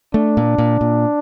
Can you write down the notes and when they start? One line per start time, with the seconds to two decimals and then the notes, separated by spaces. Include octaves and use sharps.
0.14 A3 D4
0.37 A#2
0.58 A#2
0.81 A#2